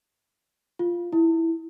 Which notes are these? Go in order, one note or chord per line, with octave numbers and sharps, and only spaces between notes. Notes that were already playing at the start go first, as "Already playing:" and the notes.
F4
E4